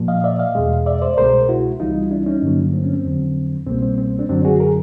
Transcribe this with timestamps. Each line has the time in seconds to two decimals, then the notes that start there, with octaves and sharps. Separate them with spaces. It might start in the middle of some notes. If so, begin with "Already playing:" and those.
Already playing: A#2 F3 A#3
0.08 D#5 F5
0.24 D5 E5
0.39 D#5 F5
0.55 E2 B2 G#3
0.86 D5 E5
1.02 C5 D5
1.17 C2 B2 G#3 A#4 C5
1.49 E4 F#4
1.80 C2 C3 E3 G3 D#4 F4
2.11 D4 E4
2.26 C#4 D#4
2.42 G2 D3 F#3 A#3
2.73 C4
2.83 C#4
2.93 C4
3.05 F2 D3 F#3
3.66 C2 B2 G3 A#3 C4
3.82 C4
3.98 C4
4.19 C4 D4
4.29 F#2 D3 F#3 C4 D4
4.44 F#4 G#4
4.60 G#4 A#4